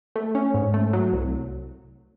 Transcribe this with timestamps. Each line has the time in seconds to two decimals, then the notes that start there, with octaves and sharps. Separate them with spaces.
0.16 A3
0.35 C#4
0.54 G#2
0.74 A3
0.93 F#3
1.12 C2